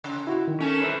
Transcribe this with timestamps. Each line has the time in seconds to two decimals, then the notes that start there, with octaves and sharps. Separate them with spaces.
0.04 C#3
0.27 E4 F#4
0.48 D#3
0.61 A3 C#4 A4 A#4
0.82 B4 C5 E5